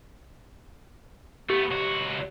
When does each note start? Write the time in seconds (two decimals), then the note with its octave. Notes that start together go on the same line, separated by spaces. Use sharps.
1.50 A3 B3 G4
1.71 C#2 F#4